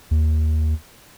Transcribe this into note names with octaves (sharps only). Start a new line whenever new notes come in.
D#2